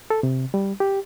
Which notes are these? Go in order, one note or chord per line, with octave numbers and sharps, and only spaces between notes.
A4
C3
G3
G4